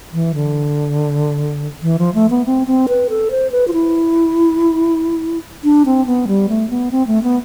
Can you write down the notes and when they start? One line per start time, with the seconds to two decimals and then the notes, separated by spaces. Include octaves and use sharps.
0.13 E3
0.34 D3
1.82 E3
1.99 F3
2.14 A3
2.30 B3
2.46 C4
2.67 C4
2.88 B4
3.10 A4
3.31 C5
3.52 B4
3.68 F4
3.73 E4
5.64 D4
5.86 C4
6.06 B3
6.27 G3
6.49 A3
6.70 B3
6.92 C4
7.07 A3
7.23 B3